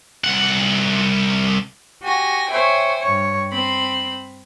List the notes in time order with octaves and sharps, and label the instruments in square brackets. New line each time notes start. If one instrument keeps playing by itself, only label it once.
[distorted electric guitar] C2 F#5
[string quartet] F#4 G4 G#5 A#6
C5 C#5 E5 G5 G#5
G2 C#5
C4 B5 C6